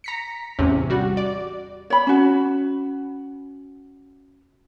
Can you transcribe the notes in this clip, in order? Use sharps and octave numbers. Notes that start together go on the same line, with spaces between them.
A#5 B6 C#7
A1 E2 C3 C#4
G3 F#4
D5
C#5 B5
C#4 F#4